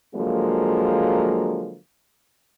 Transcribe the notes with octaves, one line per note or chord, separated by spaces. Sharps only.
D3 F3 F#3 G#3 A#3